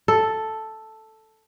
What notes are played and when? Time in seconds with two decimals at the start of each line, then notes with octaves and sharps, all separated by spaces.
0.08 A4